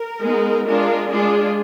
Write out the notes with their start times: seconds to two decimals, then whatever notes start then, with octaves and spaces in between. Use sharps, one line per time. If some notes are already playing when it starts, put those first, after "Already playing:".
Already playing: A#4
0.23 G#3 B3 D#4
0.67 G#3 D4 F4 A#4
1.11 G#3 D4 F4 G#4